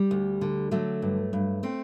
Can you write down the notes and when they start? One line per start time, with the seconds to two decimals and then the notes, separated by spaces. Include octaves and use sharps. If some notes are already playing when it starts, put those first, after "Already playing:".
Already playing: G3
0.11 D2
0.41 D3
0.71 D3 F#3 A3
1.02 G2
1.33 G2
1.63 A3 C4